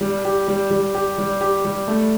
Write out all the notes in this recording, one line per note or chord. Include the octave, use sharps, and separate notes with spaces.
G3
G4
G3
G3
G4
G3
G4
G3
A3